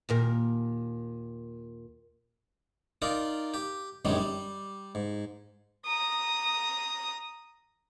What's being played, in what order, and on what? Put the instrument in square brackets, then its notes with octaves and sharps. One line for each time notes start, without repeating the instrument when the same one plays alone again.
[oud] D#2 A#2 A#4
[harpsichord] D#4 F4 A#4 D5
G4
A#1 F#2 D#3 G3 G#3
G3
G#2
[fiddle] A#5 D#6